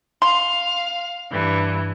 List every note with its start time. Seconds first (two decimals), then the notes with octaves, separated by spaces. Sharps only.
0.22 F5 C6
1.31 G2 E3